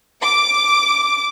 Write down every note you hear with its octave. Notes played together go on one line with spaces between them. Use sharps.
D6